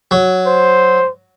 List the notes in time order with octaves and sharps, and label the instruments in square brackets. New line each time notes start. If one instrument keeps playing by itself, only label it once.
[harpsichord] F#3
[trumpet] C5